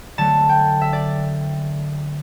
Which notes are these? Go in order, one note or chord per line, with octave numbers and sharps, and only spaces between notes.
D3 F#3 A3 A5
G5
E5
D5